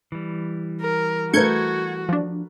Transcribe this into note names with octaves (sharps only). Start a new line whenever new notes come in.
E3 G3
A#4
A3 F#4 A#4 B4 G6 G#6 C#7
F3 D4